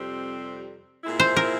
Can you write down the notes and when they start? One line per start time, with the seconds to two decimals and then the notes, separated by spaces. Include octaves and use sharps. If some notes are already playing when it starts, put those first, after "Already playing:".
Already playing: F2 C3 G3 C4
1.04 A#2 G#3 C4 E4
1.20 C5
1.37 A#4